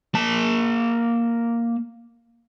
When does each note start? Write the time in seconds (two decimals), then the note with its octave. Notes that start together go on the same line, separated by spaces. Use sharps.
0.15 A#3 A5